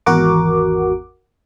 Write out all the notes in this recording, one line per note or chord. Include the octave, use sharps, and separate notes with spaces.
G#1 E2 F#4 A#4 F#5 D6